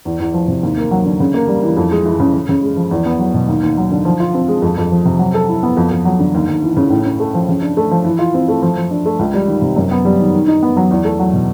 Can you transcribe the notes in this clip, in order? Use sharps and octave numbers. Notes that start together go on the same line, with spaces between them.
E2
E2
F3
C3
D#2
A#3
F#3
D3
C#3
A#3
G3
E3
F2
G#3
E3
C#3
C#3
C#3
G#3
F3
E2
B3
F#3
B2
D#2
D#2
F#3
D3
F3
F4
C4
G#3
F2
F2
F3
C3
F#3
A4
E4
B3
F2
F2
F#3
D3
D#2
D#2
E3
C#3
A2
C#4
A3
F3
C#3
D4
A3
F3
E3
F4
C4
A3
F3
F3
D4
A3
C#2
G3
D#3
C3
F#2
B3
G3
D#3
D#3
D#4
B3
F#3
E2
A3
F#3
B2